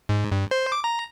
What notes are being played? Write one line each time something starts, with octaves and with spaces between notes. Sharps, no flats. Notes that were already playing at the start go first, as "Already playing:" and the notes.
G#2
G2
C5
D6
A#5